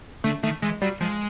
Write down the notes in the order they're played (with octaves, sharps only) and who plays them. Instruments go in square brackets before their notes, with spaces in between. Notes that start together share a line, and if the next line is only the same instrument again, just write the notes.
[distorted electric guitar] D3 [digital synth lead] A3
[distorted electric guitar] D#3 [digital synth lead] A3
[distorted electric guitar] E3 [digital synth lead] G#3
[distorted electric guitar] F#3 [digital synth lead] G3
[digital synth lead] F3 [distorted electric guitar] G#3